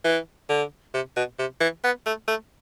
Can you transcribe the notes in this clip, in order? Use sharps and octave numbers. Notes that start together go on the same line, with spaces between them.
E3
D3
C3
B2
C3
E3
B3
A3
A3